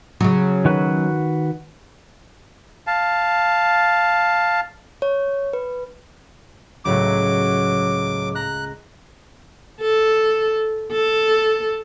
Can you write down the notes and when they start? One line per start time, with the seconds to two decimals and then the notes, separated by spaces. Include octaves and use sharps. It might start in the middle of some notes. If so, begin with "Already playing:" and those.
0.21 C#3 F#3
0.65 D#3 F#4 B4
2.87 F5 A5
5.02 C#5
5.53 B4
6.85 C#2 A2 F#3 D6
8.35 A#5 F#6
9.81 A4
10.92 A4